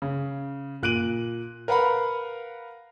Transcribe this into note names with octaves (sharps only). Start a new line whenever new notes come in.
C#3
A#2 F#6 D7 D#7 F#7
A#4 B4 F5 F#5 B5